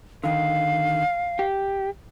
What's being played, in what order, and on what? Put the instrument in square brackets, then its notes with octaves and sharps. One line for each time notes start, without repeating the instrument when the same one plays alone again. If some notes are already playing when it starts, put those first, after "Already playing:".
[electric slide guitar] D3 D#3 [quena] F5
[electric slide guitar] G4